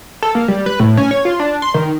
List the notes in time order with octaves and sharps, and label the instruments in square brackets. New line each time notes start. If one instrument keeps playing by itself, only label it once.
[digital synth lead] A4
A#3
G3
B4
A2
C#4
C#5
F4
D4
C6
D#3